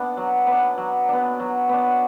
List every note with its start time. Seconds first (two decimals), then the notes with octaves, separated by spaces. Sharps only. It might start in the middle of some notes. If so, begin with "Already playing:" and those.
Already playing: B3 D4
0.17 F#3
0.47 B3 D4
0.78 F#3
1.09 B3 D4
1.40 F#3
1.69 B3 D4